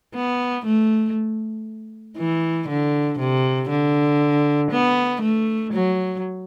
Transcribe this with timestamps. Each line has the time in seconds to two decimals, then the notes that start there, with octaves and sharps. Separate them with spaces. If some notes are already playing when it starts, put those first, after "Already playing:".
0.15 B3
0.66 A3
2.18 E3
2.69 D3
3.19 C3
3.69 D3
4.72 B3
5.22 A3
5.73 F#3